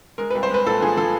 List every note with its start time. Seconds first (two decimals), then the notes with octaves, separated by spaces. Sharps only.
0.18 G#3 A#4
0.30 B4
0.35 C2
0.43 C5
0.50 G#3 B4
0.66 A#2 A4
0.82 F3 G#4
0.97 F3 A4